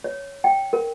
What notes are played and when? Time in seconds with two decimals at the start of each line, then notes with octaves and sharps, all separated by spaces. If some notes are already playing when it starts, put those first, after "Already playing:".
0.04 C#5
0.44 G5
0.73 A#4